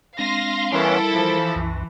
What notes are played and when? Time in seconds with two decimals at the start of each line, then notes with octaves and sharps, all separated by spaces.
0.19 G#3 C4 D4 F5 C6 A#6
0.72 E3 G3 B3 C#4 E4 A4 A#4 A5
1.12 E3 F3
1.56 C2 F#2